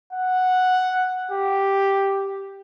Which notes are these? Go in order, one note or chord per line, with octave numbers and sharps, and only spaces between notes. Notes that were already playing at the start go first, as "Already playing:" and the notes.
F#5
G4